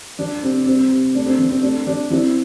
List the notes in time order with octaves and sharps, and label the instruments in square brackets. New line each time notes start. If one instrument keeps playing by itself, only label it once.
[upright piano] F3 D4
C3 C4
G3 C4
C3
A3 D4
C4
F3
C4
A3 D4
F3 D4
F3 C4 E4